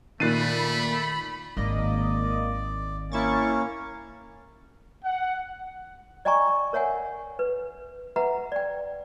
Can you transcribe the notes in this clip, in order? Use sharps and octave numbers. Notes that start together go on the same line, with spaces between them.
A#2 D#3 A3 B5 F#6 A6 C7 D#7
G#1 D#3 A#3 D5 D#5
A#3 C#4 E4 C#6 A6
F#5
D5 D#5 G5 G#5 A#5 C#6
A#4 C#5 E5 F#5 G#5
B4
B4 E5 F#5 A#5
D5 G5